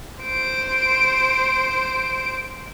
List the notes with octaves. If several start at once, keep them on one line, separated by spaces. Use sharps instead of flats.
C5 D7